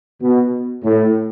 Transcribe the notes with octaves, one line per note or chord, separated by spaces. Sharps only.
B2
A2